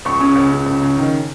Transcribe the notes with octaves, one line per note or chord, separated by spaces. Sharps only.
C#2 C#6
C#3
C#2
C#3
C#2
C#3
D#3